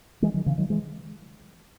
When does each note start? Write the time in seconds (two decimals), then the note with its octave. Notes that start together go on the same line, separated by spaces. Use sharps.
0.22 E3 G#3
0.34 D#3 F#3
0.46 C#3 E3
0.58 D#3 F#3
0.70 E3 G#3